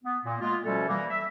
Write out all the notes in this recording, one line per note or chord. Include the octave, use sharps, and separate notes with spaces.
B3
A#2 A#3
G#3 A#3 B3 F4
B2 F3 G3 A3 C#4 A4
E3 G3 A#3
E5